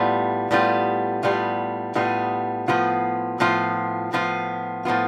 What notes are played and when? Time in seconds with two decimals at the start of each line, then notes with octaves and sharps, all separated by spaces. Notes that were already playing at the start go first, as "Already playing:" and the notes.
Already playing: A2 G3 B3 F4
0.51 A2 G3 B3 F4
1.23 A2 G3 B3 F4
1.95 A2 G3 B3 F4
2.68 A2 F3 B3 F4
3.40 A2 F3 B3 F4
4.13 A2 F3 B3 F4
4.85 A2 F3 B3 F4